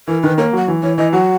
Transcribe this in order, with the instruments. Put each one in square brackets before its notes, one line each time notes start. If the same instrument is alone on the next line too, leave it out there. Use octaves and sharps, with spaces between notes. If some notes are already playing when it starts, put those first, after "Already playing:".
[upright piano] E3 [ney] A#4
[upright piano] D#3 [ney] B4
[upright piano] A#3 [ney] C#5
[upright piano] F#3 [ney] F#5
[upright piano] E3
[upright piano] E3 [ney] C#5
[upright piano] E3 [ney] D#5
[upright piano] F#3 [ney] F#5